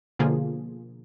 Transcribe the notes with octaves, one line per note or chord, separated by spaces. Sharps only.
B2 D3 F3 A#3 F4 G#4